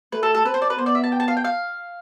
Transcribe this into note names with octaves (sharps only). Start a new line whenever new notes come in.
A3 B4
A4
A4
C4 B4
C5
D5
B4
B3 C5
D5
E5
A5
G5
A5
F5
G5
F5